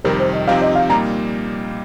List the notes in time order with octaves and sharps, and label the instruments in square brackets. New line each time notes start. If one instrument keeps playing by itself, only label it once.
[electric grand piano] F2 C3 D#3 G3 [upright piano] A#4
[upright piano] C5
D#5
[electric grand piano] C3 F3 C4 D#4 G4 [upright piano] F5
[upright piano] D#5
F5
[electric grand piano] A#2 G3 A#3 D#4 [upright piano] A#5